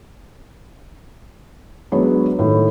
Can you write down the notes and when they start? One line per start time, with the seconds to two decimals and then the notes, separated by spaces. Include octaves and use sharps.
1.92 F#3 G#3 B3 D4 B4 C#5
2.39 A2 D#3